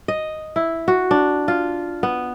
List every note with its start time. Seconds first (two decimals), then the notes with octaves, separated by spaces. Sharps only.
0.08 D#5
0.56 E4
0.88 F#4
1.11 D4
1.48 F4
2.03 B3